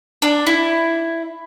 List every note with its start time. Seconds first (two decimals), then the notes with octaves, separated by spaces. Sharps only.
0.22 D4
0.47 E4